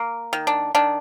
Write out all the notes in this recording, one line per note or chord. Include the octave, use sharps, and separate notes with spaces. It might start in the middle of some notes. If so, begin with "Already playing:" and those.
Already playing: A#3
D#3
D4
D#3 D4